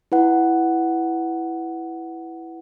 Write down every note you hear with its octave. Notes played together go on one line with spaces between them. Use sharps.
E4 B4 F#5